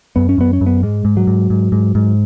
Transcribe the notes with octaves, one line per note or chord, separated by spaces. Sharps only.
F#2 B3
C#4
F#2 B3
C#4
F#2
B3
G#2 G#3
G#2
F#3
G#2
G#2
G#2
G#2